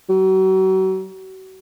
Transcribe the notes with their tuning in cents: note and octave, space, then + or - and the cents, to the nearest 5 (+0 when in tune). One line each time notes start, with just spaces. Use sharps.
F#3 +35